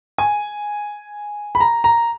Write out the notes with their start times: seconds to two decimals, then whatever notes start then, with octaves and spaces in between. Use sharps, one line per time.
0.18 G#5
1.55 B5
1.60 A#5
1.84 A#5